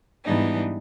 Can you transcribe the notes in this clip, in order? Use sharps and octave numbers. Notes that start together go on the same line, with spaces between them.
G#2 E3 G3 B3 D4 D#4